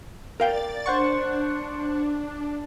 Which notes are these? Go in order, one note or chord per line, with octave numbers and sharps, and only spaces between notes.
A#4 D5 F5 G5 A6
D4 C5 F#5 C#6